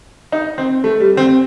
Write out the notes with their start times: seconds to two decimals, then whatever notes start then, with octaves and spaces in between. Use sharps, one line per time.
0.32 D#4
0.58 C4
0.84 A3
1.00 G3
1.17 C4